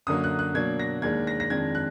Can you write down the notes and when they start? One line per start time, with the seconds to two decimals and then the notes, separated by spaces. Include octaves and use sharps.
0.07 F#2 D3 F#3 A#3 D#6
0.24 F#6
0.39 F#6
0.54 B2 F#3 A#3 D4 G#6
0.79 A#6
1.02 D#2 D#3 G#3 D4 G#6
1.27 A#6
1.40 A#6
1.50 F2 D#3 G#3 D4 G#6
1.75 F#6